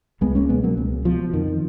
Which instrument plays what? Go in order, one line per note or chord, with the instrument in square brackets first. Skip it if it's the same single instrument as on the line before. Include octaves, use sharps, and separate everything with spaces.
[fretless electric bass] C#2 G#3 B3
A#3 C#4
B2 G#3 B3
F#3 A#3
C#2
B2 F3
F2 D#3